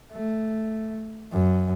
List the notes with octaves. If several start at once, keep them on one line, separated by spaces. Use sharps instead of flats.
A3
F#2